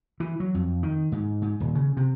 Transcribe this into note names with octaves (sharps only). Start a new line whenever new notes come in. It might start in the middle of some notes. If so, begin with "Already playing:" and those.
E3
F#3
F2
D#3
G#2
G#2
D#1
C#3
C3